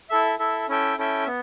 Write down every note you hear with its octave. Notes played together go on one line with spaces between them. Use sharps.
E4 A4 E5
E4 A4 E5
C#4 E4 A4 E5 G5
C#4 E4 A4 E5 G5
B3